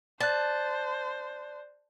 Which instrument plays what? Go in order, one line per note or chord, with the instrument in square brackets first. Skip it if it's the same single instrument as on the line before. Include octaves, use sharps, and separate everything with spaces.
[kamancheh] C5 [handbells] D5 F#6 [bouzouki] A5